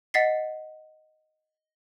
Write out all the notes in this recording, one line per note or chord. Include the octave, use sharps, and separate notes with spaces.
D#5 F#5 A6 B6 C7